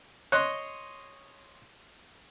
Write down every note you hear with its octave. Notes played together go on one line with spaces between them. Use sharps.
C#5 D#5 C6 F#6